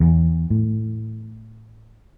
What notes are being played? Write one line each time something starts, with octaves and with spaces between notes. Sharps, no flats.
E2
A2